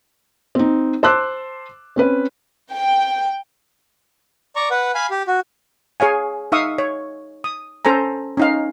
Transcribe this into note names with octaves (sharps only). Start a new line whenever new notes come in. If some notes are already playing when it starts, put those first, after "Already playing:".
C4 D#4
C5 A5 C6 D6 E6 F#6
C4 C#4 B4
G5
D5 A#5 C#6
B4 F#5
F5 G#5 B5
G4
F#4
G#4 C#5 F5 G#5
D#4 E5 F5 C#6 D#6 E6
C#5
D#6
C#4 A4 C5 G#5 A#5
C#4 D#4 F5